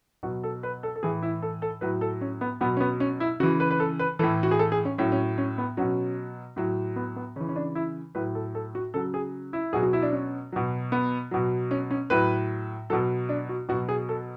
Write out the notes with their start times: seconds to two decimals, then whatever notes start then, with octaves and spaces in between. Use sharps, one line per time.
0.23 B2 F#3 F#4
0.44 A4
0.63 B4
0.83 A4
0.96 A4
1.03 A2 E3 G#4
1.22 E4
1.42 A4
1.62 A4
1.81 A2 F#3 B4
2.01 A4
2.21 C#4
2.41 B3
2.61 B2 F#3 B3
2.77 C#4
2.80 B3
3.00 C#4
3.20 E4
3.40 C#3 F#4
3.43 E3
3.60 B4
3.71 B4
3.80 A4
3.99 B4
4.19 A2 E3 A4
4.43 F#4
4.51 G#4
4.59 A4
4.72 G#4
4.85 C#4
4.98 A2 F#3 C#4
5.12 C#4
5.38 C#4
5.58 B3
5.77 B2 F#3 C#4
6.56 A2 F#3
6.96 B3
7.16 B3
7.36 C#3 E3 C#4
7.49 C#4
7.56 D4
7.75 E4
8.15 A2 F#3 B4
8.35 A4
8.55 A4
8.75 F#4
8.94 C#3 F#3 A4
9.14 G#4
9.53 E4
9.73 B2 F#3 G#4
9.83 F#4
9.93 E4
10.02 D4
10.13 C#4
10.52 B2 F#3
10.92 B3
11.31 B2 F#3
11.71 C#4
11.91 C#4
12.10 A2 F#3 B4
12.90 B2 F#3 A4
13.29 D4
13.49 F#4
13.69 B2 F#4
13.72 F#3
13.89 G#4
14.09 A4